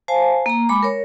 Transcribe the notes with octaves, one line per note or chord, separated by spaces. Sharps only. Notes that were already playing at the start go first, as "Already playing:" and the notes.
C5 F5 G#5 A5
A#3 A#5
G#3 B5 D6
A#4 C#5